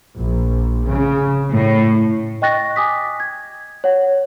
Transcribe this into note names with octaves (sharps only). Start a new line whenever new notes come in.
A#1
C#3
A2
D#5 G5 C#6 F#6 A6 A#6
G#5 D6 D#6 B6
G#6
C#5 F#5